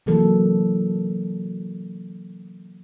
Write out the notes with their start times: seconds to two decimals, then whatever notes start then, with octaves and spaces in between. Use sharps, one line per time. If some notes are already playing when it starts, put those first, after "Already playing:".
0.06 C3 E3 F#3 A#3 A4